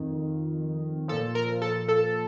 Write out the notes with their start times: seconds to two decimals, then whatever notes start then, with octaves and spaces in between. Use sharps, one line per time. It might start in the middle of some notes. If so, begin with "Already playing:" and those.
Already playing: F2 D#3
1.08 A#2 F3 A4
1.35 A#4
1.62 A4
1.88 A4